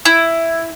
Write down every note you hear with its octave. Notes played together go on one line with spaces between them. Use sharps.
E4